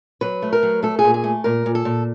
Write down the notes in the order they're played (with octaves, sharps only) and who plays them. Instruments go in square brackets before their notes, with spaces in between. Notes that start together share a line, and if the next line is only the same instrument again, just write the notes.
[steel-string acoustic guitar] F#3 B4
A3
A#4
F#3
A3 A4
G#4
A#2
G#4
A3
A#2 A#4
A#2
A4
A#2